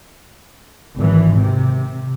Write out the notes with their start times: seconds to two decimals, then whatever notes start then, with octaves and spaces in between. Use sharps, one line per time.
0.96 G#1 E3
1.36 C3